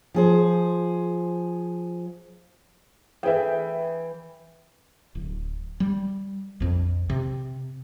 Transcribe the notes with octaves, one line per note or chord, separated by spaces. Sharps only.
F3 G#4 C5
E3 G#4 B4 E5 G5
D1
G3
A#1 F2
C3